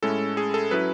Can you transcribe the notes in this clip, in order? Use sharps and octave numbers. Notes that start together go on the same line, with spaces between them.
A2 G#3 C#4 E4 A4
G#4
A4
F#3 C#4 E4 B4